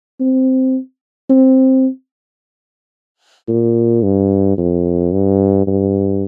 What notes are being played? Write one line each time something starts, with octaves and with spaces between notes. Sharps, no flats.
C4
C4
A#2
G2
F2
G2
G2